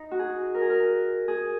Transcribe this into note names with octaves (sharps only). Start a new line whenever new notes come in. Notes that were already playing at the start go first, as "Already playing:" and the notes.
Already playing: D#4
F#4
G#4
A#4
G#4
A#4
G#4